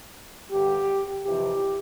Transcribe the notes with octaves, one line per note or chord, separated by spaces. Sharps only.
G2 D3 G4
F2 C3 E3 G4